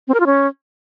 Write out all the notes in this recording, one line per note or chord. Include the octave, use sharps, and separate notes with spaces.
C4
A#4
F4
C#4